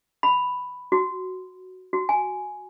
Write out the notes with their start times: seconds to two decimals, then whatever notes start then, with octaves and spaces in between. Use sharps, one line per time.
0.23 B5
0.92 F#4
1.93 F#4
2.09 G#5